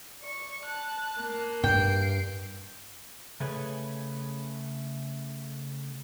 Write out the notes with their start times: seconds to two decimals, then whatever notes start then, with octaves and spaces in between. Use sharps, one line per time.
0.21 D5 C#6
0.64 A5 F#6
1.19 A#3
1.64 G2 G5 C7 D7
3.40 C#3 A3 G#4 B4 C#5